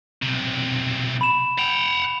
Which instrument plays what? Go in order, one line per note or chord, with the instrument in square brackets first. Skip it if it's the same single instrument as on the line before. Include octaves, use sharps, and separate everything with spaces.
[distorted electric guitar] B1 C3
[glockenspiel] B5 E7
[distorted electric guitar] F#5 G5 [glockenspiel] F7